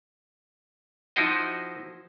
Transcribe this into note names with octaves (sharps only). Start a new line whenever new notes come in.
F3 D#4 E4 F#4 C5 D#5